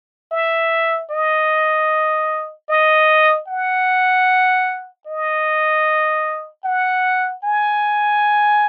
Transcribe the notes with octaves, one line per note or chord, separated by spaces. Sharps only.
E5
D#5
D#5
F#5
D#5
F#5
G#5